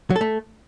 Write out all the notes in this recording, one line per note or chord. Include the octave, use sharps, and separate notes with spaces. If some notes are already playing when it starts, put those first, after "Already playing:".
F#3
A4
A3